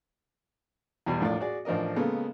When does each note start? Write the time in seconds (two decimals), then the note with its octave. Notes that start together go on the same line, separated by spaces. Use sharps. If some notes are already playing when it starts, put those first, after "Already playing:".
1.06 E2 B2 G3
1.20 A#1 A2 F4 D5
1.41 F#4 G#4 D5
1.65 A1 F3 D4 A#4 D#5
1.96 C#3 G#3 A#3 B3 A4